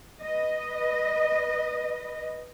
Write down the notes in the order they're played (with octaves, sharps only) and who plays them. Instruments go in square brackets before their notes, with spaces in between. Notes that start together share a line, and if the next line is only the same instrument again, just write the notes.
[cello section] B4 D#5